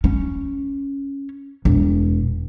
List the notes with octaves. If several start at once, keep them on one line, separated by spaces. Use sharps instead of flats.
C#4
E1